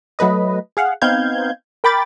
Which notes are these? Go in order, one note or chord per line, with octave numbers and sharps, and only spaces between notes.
F#3 A3 B4 D#5
G#4 F5 F#5
B3 C4 D#4 F5 G6 G#6
A#4 G5 B5 D6 A6